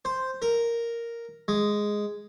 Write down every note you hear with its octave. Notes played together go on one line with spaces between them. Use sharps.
C5
A#4
G#3